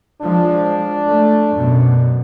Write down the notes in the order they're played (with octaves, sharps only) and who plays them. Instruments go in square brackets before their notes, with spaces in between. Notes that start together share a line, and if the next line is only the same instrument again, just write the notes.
[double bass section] F3 G#3 [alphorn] D4
[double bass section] A3
F#2 B2